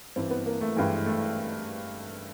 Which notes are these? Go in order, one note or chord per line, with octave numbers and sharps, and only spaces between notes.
G2 E3 C4
B3
A#3
A3
G2 E3 G#3
A3